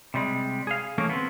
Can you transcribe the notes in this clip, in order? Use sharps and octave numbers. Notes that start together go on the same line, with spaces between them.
C3 G3 G#3
G#4 F5
E3 A3 A#3 C#4 G#4
B3 C4